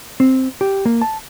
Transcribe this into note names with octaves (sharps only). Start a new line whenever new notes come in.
C4
G4
A#3
A5